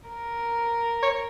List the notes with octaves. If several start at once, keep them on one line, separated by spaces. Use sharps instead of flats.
A#4
C#5